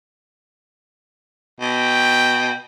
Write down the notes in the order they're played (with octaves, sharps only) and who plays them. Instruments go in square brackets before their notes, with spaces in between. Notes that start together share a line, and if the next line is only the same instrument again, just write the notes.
[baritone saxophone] B2 [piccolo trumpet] G5